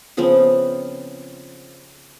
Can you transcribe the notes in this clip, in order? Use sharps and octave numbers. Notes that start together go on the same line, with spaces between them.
C#3 F3 B3 C4